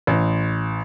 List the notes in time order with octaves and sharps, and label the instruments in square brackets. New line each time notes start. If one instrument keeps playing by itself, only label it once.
[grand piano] A1